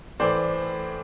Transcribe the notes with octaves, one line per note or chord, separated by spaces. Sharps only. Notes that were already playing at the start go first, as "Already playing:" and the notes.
A2 E3 A3 C5 D5